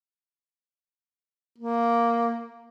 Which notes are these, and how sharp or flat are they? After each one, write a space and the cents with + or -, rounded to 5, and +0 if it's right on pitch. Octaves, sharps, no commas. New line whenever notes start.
A#3 +0